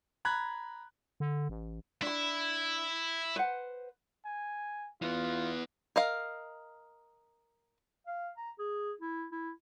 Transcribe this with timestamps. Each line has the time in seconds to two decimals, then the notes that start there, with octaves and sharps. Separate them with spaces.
0.25 A#5 B5 F#6 G#6
1.20 D3
1.49 A1
2.02 D4 E4 B5
3.36 B4 C5 F#5
4.26 G#5
5.02 E3 B3 F4
5.96 A#4 D#5 F5
8.07 F5
8.37 A#5
8.59 G#4
9.01 E4
9.32 E4